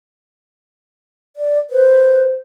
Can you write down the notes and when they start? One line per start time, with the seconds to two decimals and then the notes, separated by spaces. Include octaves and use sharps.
1.36 D5
1.70 B4 C5